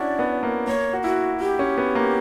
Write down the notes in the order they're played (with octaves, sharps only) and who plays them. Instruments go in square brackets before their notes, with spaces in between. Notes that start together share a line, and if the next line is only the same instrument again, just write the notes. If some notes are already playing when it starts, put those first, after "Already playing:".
Already playing: [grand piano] C#4 D4 E4 F#4 [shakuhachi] D5
[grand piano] B3
A#3
[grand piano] A#3 [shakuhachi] C#5
[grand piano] F#4
[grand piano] E4 [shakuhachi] F#4
[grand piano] E4 [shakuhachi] G4
[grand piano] C#4
B3
A#3